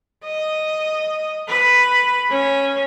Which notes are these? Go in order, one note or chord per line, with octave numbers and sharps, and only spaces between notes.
D#5
B4
C#4